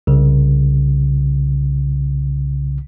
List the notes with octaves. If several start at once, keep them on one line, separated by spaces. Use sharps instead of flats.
C2 C#3